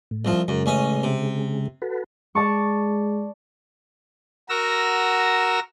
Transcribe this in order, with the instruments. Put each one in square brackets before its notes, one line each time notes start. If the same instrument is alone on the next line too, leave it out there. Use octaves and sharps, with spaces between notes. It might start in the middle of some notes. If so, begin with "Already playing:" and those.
[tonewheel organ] A2
[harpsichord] C2 F3
[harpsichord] F#2 [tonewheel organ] C#3 G#3
[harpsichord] A1 C#4 D#5
C3
[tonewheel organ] F#4 A4 B4
[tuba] G#3 [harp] D5 A5 C#6
[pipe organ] F#4 A#4 E6 A#6